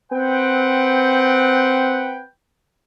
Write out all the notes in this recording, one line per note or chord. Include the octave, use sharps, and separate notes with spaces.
C4 B4 F#5 G5